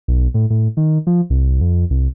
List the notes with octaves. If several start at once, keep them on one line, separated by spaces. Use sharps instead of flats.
B1
A2
A2
D#3
F3
C2
F2
C2